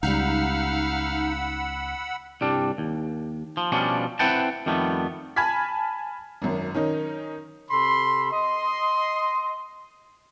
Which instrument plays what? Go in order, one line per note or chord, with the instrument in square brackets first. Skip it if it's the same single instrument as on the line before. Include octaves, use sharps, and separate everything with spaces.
[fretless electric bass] C#2 G3 [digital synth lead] D#4 [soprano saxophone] F5 [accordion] F#5 B5 E6
[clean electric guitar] C2 G2 G3 D4
D#2
F3
B2 F3 G3 C#4 D4
C4 E4 B4 F#5 G5 A5
F2 D#3 G3 A3 B3
[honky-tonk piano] G#5 A5 B5 F6 G#6 B6
G#1 F#2
D#3 C#4 D#4
[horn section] C3 A4 B5 C6
D#5 C6